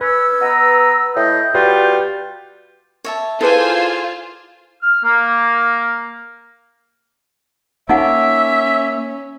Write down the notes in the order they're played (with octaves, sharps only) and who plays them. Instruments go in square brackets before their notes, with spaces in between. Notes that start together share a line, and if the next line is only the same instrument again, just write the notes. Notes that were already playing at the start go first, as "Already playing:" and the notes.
[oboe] C#4 [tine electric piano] B4 [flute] E6
[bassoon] B3 [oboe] A#5
[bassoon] A2 [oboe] D#5 [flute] G6
[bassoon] G3 [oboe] F4 [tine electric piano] F#4 B4
[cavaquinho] C#5 E5 A5
[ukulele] E4 G#4 B4 [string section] F4 [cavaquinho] A4 D5 [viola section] C5 G#5
[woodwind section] F6
A#3
[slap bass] A#3 [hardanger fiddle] C#4 [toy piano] D#4 F#5 [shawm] E5